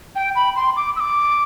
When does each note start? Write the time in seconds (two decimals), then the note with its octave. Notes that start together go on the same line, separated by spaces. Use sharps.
0.15 G5
0.35 B5
0.56 C6
0.76 D6
0.96 E6
1.00 D6